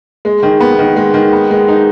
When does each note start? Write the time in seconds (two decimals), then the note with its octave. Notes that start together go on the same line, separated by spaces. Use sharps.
0.25 G#3
0.43 D#3
0.60 B3
0.79 D#3
0.96 G#3
1.14 D#3
1.33 B3
1.50 G#3
1.68 D#4